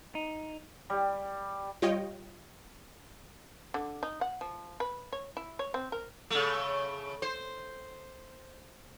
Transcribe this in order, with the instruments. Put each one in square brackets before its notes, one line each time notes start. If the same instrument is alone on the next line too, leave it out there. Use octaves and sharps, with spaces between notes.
[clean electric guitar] D#4
[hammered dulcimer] G3
[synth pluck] G3 F4 C#5 D#5 G5
[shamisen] D3
D#4
F#5
F3
B4
C#5
E4
C#5
C4
A#4
[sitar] C#3 A3
C5